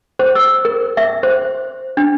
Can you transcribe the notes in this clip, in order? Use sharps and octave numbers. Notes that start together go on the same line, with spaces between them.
C5
E6
A#4
E5
C5
D4